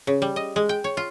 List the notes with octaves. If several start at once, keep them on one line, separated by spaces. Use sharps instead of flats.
C#3
G3
D#5
G#3
G5
C#5
F4